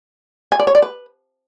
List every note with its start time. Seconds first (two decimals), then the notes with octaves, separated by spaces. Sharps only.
0.52 G#5
0.60 D5
0.67 C#5
0.75 D5
0.82 B4